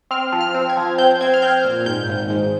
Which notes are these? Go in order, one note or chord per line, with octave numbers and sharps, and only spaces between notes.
C4 F6
F3
F6
C4
G#6
F3
C4 G6
C4 G#6
F6
C4 G6
A#2
G#2 G6
G#1
G#2